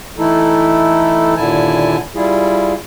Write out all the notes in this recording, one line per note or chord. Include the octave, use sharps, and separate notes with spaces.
E3 A3 D#4 E4 A4
D#2 A#2 D3 E4 G#5 A5
G3 E4 F4 G#4